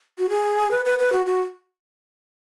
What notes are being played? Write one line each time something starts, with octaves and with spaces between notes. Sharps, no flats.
F#4
G#4
B4
B4
B4
F#4
F#4